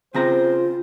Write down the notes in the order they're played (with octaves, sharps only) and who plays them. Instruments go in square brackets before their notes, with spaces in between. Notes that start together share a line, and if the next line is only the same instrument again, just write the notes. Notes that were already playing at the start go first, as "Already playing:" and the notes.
[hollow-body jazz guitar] C#3 C4 A#5 [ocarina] F4 [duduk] C5